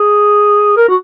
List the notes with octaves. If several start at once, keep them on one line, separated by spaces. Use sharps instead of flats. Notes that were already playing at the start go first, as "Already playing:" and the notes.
Already playing: G#4
A#4
F#4